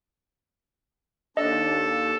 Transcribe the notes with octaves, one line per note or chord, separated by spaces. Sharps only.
D#2 D4 A4 D#5